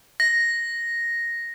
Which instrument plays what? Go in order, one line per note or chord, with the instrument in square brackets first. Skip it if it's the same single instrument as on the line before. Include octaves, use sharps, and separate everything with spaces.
[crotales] A#6